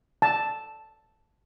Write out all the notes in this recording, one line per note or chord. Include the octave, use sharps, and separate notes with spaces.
A5